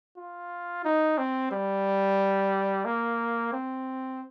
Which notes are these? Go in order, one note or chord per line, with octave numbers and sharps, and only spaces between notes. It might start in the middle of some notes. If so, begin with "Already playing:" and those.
F4
D#4
C4
G3
A#3
C4